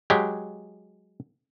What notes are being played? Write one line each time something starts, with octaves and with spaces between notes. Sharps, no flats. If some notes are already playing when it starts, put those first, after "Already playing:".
F#3 G#3 G4